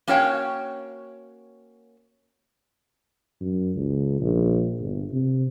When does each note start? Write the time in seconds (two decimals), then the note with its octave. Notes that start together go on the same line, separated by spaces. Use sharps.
0.08 A#3 C#4 F#4 C#5 F5 G5
3.41 F#2
3.76 C#2
4.20 A#1
4.80 G1
5.12 C3